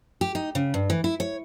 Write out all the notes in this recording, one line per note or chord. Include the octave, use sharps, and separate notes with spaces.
G4
D#4
C#3
G2
E3
E4
C#5